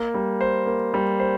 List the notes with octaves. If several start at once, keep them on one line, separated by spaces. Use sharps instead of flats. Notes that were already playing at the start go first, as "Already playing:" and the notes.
Already playing: A#3
G3
C5
A#3
G3
C5